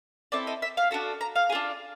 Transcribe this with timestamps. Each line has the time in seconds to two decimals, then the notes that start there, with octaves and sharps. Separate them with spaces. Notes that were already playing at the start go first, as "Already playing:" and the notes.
0.32 C4 E4 A4 D5
0.47 D#5
0.62 E5
0.77 F5
0.91 D4 F#4 A4
1.21 A#5
1.36 F5
1.50 G#4
1.52 D4 F4